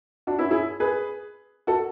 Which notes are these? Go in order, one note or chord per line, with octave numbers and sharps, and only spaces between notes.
D4 F#4
C#4 E4
E4 G#4
G#4 B4
F#4 A4